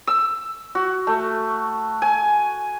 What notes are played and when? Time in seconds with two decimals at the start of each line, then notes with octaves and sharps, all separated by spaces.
0.07 E6
0.75 F#4
1.07 A3
2.02 G#5